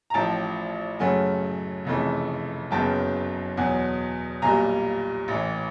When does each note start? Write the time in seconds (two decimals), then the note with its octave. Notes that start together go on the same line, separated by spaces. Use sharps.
0.10 A#5
0.14 A1 A2 F3 G5 A5
0.99 F#2 C#3 F#3 A3 F#5 G#5
1.85 F1 F2 C#3 E3 A3
2.71 F#1 F#2 C#3 F#3 B3 G5 A5
3.57 E2 B2 F#3 F#5 G#5
4.42 B1 A#2 G3 G#5 A#5
5.28 A1 A2 E3